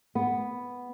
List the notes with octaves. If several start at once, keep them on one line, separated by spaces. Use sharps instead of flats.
B3